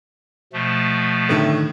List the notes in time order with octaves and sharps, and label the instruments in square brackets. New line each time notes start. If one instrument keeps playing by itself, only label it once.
[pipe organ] B2 F3 A3
[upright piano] A2 D3 D#3